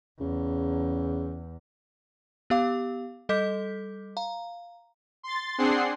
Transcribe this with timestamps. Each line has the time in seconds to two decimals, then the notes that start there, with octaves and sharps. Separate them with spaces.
0.20 E2 C#3
2.50 B3 G4 F5 D6
3.29 G3 A4 D#5 D6 G6 B6
4.17 F5 A#5
5.23 C6 A6
5.58 C4 D4 G#4 F#5 C6 C7